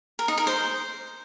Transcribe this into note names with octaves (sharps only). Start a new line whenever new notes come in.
A#4
D#4
A#4
C5